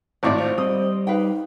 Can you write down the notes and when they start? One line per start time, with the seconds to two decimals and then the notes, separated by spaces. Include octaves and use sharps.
0.23 G#1 A2 A#3 C4 E4 D5
0.38 F4 C5
0.58 G3 C4 D#5 D#6
1.07 D#4 B4 F5 G5